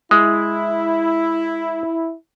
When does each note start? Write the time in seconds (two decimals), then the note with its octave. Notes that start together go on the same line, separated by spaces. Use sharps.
0.11 G#3 E4